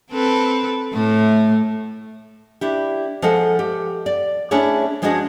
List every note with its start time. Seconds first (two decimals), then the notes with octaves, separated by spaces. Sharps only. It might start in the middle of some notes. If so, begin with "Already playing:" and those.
0.11 C4 A4 B4
0.93 A2 A3
2.61 D4 E4 G4
3.22 F3 G#3 A4 D#5 F#5
3.59 G4
4.06 D5
4.51 A3 C#4 D4 E4 G#4 C#5
5.02 F3 G#3 D4 F#4 G#4 D#5